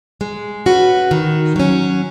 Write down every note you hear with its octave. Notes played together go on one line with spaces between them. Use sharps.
G#3
C#4 F#4 B4
D#3
F#3 C#4